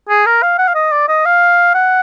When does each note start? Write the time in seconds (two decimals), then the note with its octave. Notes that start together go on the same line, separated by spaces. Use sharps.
0.09 G#4
0.26 A#4
0.42 F5
0.58 F#5
0.68 F5
0.75 D#5
0.92 D5
1.08 D#5
1.25 F5
1.74 F#5